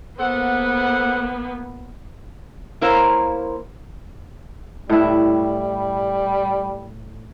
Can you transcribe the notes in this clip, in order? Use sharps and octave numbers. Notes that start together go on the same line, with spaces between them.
A#3 B3 A4 C5 F#5
A#3 E4 A#4 C5 C#5 F5
A2 G3 E4